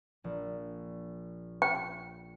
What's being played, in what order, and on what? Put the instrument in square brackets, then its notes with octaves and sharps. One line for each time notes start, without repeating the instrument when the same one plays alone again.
[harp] A#1
[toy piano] G5